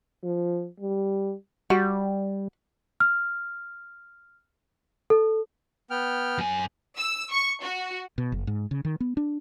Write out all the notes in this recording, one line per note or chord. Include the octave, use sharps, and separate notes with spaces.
F3
G3
G3 F#4
F6
A4
B3 G5 F6
F#2 G#5
E6
C#6
F#4
B2
F#1
G#2
C#3
D#3
B3
D4